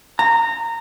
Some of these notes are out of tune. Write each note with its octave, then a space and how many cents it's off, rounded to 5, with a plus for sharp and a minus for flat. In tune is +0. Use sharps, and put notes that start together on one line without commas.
A#5 -20